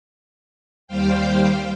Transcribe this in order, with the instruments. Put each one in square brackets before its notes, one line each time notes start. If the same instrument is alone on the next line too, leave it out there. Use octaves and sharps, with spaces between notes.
[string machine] D#2 G3 C5 F5 G5